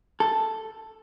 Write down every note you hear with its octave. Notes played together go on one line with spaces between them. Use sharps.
A4